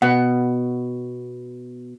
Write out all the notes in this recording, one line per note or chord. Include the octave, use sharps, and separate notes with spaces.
B2 F#5